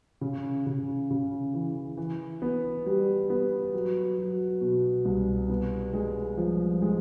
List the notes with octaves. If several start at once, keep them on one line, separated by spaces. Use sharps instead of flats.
C#3
C#3
C#3
E3
E3
B3
G3
B3
F#3
F#3
B2
C2
B3
G#3
F3
G#3